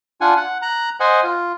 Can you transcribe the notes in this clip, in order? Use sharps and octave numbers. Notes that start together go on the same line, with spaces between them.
D4 F4 F#5 G#5
F#5
A#5 F#6
C5 D#5 F#5 G#5
F4